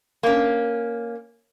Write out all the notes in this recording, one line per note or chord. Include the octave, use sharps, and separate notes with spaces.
A#3 C#4